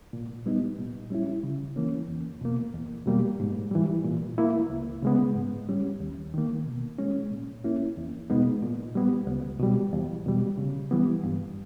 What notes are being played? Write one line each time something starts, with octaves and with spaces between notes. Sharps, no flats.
A#2
G3 B3 D#4
A#2
G3 C#4 E4
C#3
E3 A#3 C#4
E2
B2 A#3
E2
B2 G3 A#3
G#2
E3 G3
A#2
A#3 E4
C#2
C#3 G#3 B3
G#2
G3 C#4
D#2
D#3 A#3
B2
G#3 C#4
A#2
A#3 C#4 E4
E2
B2 G#3 B3 D#4
A#2
G3 B3
C#2
B2 G3
E2
B2 G3
C#3
E3 G3 B3
G2